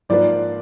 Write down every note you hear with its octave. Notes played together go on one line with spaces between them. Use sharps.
G#2 F3 A#3 F4 B4 D5